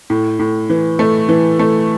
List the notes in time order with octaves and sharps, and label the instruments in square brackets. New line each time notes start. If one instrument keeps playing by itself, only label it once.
[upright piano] A2
A2
E3
A3
E3
A3